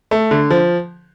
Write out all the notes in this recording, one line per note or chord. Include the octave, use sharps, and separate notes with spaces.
A3
D3
F3